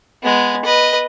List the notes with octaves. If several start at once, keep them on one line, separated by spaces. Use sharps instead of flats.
G#3 B3
B4 D#5